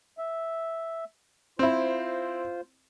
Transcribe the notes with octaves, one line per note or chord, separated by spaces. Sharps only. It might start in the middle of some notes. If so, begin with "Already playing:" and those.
E5
C4 E4 F4 C5